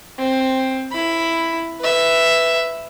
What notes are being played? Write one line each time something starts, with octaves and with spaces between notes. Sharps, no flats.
C4
E4 B5
B4 E5